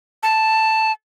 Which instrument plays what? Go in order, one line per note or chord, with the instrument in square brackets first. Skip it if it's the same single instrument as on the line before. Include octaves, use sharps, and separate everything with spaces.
[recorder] A5